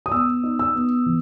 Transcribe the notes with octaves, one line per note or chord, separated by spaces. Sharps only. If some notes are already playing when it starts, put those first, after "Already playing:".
D#6
B3 E6
D#4
E6
B3
E3